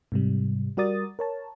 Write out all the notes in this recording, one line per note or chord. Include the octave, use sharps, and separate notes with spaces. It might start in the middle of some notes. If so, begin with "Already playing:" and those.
G#2 C3 G3
G3 F#4 A#4 D5 D#6 A6
A#4 C#5 A5